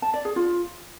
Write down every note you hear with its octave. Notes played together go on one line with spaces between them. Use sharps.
A5
D5
G#4
F4